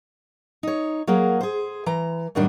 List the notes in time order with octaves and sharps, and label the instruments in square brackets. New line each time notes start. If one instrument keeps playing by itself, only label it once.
[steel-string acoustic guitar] D#4 C#5
F#3 A#3 G#4 A#4
G#4 C5
E3 A#5
F#2 A2 D#3 G3 D4